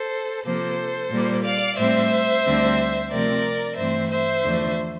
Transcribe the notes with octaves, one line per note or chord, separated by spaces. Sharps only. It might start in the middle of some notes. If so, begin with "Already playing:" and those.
Already playing: A4 C5
C3 F3 A#3 A4 C5
A#2 G3 A#3
D5 F5
A2 G3 C4 C5 E5
D2 D3 G3 C4
C3 F3 A3 C4 A#4 D5
G2 E3 A3 C4 C5 E5
C5 E5
E2 D3 F3 A3